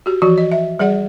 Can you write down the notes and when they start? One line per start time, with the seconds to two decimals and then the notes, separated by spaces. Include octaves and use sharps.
0.06 F#4 G4
0.22 E3 F3 F#4
0.38 D#5
0.51 E5
0.79 G3 G#4 D5 F#5